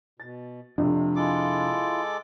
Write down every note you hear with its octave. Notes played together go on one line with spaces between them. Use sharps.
B2 A6
F2 C3 A3 D4
G#3 E4 F4 A4 D6